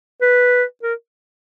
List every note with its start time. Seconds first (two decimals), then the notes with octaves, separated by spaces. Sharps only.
0.22 B4
0.83 A#4